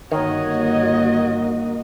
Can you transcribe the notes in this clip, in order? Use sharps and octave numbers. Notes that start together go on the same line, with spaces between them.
G1 D#3 A#3 F#4 C#5 D#5